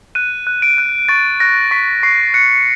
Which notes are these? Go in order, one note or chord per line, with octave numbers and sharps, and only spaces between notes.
F#6 D#7
F#6
D7
F#6
C#6 A6
F#6 A#6
C#6 B6
C#6 C7
F#6 C#7